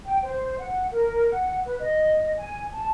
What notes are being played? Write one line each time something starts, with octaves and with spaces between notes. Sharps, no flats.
G5
C5
F#5
A#4
F#5
B4
D#5
G#5
A5